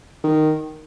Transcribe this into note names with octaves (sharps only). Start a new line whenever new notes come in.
D#3